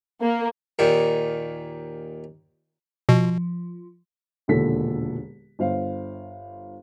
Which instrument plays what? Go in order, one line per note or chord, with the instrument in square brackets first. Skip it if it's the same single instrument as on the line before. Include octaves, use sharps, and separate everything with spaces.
[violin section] A#3
[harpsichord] D#2 A#2 D#3
[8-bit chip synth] B2 [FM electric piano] F3
[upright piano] E1 D#2 A#2 D3 A4 B6
G1 C5 F5